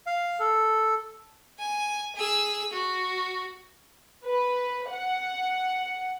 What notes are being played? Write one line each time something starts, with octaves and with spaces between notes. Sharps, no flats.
F5
A4
G#5
G#4 E6
F#4
B4
F#5